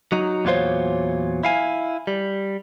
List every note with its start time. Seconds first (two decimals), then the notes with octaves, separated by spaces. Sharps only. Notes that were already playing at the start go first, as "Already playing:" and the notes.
0.12 F#3 D#4
0.45 E2 A#2 F#3 F4 C5 C#5
1.43 E4 F5 G#5
2.07 G3